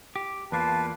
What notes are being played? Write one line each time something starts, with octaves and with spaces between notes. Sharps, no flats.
G4
E2 A#3 F4 B4 A5